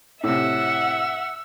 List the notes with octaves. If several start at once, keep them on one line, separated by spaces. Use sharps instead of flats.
A2 C3 E5 F#5 E6